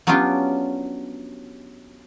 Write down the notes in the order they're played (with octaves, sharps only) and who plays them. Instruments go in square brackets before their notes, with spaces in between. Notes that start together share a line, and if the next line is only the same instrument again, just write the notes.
[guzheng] F#3 B3 C#4 D4 F4 G4